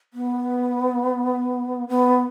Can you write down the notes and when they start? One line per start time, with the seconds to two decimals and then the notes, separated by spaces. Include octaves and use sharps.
0.14 B3
1.89 B3